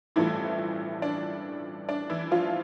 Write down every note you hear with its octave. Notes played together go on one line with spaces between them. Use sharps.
A1 G2 E3 F3 A3 E4
D4
D4
E3 E4
F3 F4